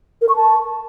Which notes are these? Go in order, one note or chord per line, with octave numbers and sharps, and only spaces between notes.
A#4
C#6
A5